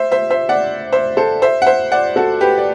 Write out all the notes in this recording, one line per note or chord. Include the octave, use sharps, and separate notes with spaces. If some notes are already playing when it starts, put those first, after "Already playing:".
Already playing: C5 E5
C5 E5
C5 E5
D5 F#5
C5 E5
A4 C5
C5 E5
F#5
C5 E5
D5 F#5
F#4 A4
G4 B4
D5